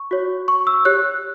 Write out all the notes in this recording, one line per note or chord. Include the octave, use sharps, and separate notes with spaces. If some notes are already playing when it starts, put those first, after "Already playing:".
Already playing: C#6
F#4 C#5
C#6
E6
G4 C#5 F#6